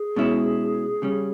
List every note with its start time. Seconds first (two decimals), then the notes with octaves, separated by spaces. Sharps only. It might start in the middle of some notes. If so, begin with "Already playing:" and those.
Already playing: G#4
0.16 B2 G#3 C#4 E4
1.02 C#3 G3 C#4